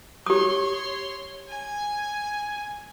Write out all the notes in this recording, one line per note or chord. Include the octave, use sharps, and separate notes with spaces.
G4 C#5 C6 D#6
G#5